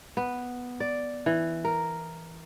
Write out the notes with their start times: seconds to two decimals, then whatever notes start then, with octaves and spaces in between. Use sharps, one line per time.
0.17 B3
0.80 D5
1.26 E3
1.64 A#4